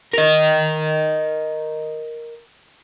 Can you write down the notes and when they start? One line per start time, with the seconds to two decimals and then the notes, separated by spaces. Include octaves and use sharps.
0.14 A#4 D#5